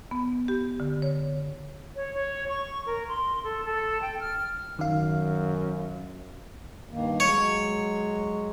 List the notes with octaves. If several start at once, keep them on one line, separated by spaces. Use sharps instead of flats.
B3
G4
D3
C#5
C#5
C#5
C#6
A#4
C6
A4
A4
G5
F6
F#2 D#3 F5
G2 D#3 A#3
F#3 G#3 C#5